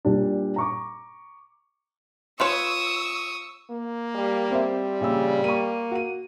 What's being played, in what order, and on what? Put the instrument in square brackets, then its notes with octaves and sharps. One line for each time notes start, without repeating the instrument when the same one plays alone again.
[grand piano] A#2 G3 D4
A#5 C#6 D6
[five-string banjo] F4 B4 C#5 [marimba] C6 [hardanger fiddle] C#6 D#6 [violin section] E6
[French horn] A#3
[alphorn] G3
[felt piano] C4 C5 E5
[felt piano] A#1 E6 [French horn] C#3
[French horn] A#3 [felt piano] C#6 D#7
[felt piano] F#4 D#7